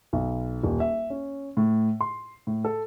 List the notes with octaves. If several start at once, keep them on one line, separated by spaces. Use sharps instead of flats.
B1
D#1
E5
C#4
A2
C6
A2
A4